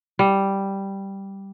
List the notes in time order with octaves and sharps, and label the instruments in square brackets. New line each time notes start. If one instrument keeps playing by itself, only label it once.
[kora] G3